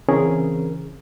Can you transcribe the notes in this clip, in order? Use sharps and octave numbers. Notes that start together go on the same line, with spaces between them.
C#3 E3 C4 C#4 G#4 A#4